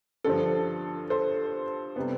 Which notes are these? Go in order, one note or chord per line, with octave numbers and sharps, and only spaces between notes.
G2 D3 F3 A4
A4 C5
C3 G3 B3